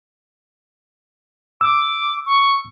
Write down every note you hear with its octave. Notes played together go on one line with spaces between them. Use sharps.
D6 E6
C#6